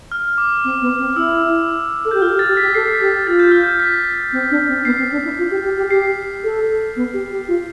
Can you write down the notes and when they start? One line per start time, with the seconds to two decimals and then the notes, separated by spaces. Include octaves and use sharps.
0.12 F6
0.38 D6
0.64 C4
0.82 B3
0.99 C4
1.16 E4 E6
2.05 A4
2.11 G4 G6
2.22 F4 F6
2.35 G4
2.39 A6
2.48 G4
2.57 B6
2.62 G4
2.75 A4 C7
2.92 B6
3.01 G4
3.27 F4 A6
3.39 G6
3.52 F6
3.63 G6
3.79 B6
4.33 C4
4.51 D4
4.68 C4
4.85 B3 C7
4.98 C4
5.12 D4
5.25 E4
5.38 F4
5.51 G4
5.64 G4
5.77 G4
5.90 G4 C7
6.44 A4
6.96 B3
7.14 G4
7.32 G4
7.48 F4